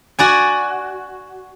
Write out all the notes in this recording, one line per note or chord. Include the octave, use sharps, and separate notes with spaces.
F#4 D5 G#5